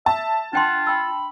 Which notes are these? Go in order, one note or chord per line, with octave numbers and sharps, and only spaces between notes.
E5 A5
D4 F4 F#5 G5 C6
G5 B5 E6